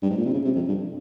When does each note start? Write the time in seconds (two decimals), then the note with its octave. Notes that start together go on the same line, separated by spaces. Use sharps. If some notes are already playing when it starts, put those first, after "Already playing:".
0.03 G2
0.10 G#2
0.18 A#2
0.25 C3
0.33 C#3
0.45 C3
0.56 F2
0.68 G2